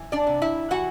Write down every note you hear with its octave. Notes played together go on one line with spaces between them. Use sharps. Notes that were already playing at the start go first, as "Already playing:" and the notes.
Already playing: E3
D4 D5
C3
E4 E5
E3 F#4 F#5